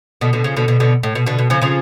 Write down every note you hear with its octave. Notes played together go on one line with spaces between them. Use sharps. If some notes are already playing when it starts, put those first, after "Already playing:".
B2 D3
B2 D3
C#3 F3
B2 D3
B2 D3
B2 D3
A2
B2
B2 D3
B2
C#3 F3
C#3 F3